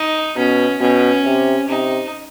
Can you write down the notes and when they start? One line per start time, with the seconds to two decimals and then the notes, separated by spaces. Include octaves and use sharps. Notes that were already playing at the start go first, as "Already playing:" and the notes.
Already playing: D#4
0.37 B2 C#4
0.81 B2 C#4
1.25 C3
1.68 C3 D#4